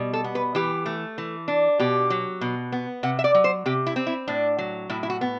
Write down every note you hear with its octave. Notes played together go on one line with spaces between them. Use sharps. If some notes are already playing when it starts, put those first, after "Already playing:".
Already playing: B2 G3
A4
B3
B4
E3 G4
A3
E3
D4
B2 G4
F#3
B2
B3
C3 F#5
E5
D5
F#3
C5
C3 G4
E4
C4
E4
A2 D4
F#3
A2 E4
E4
F#4
B3